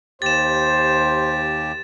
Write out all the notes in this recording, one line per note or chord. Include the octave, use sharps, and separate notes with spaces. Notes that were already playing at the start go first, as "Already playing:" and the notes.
D#2 G4 C5 A6 E7